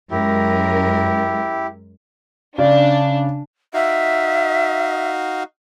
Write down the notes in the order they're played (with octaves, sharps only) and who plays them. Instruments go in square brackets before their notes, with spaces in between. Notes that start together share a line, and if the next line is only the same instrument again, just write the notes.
[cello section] F#2 G#3 A#4 [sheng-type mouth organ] E4 G4
[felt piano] C#3 [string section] D4
[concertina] D#4 F#4 F5 [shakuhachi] E5